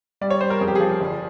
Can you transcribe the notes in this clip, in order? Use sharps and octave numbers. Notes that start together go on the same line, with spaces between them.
G3 D5
C#5
G3 C5
A#4
F2 G#4
G4
F3 G#4
G1